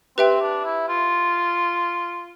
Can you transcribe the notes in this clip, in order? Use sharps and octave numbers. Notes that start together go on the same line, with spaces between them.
C4 G4 B4 E5 G5
D4
E4
F4